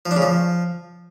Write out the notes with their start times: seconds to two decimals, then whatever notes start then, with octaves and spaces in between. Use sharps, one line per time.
0.06 F3
0.11 D4
0.17 C#3
0.22 F3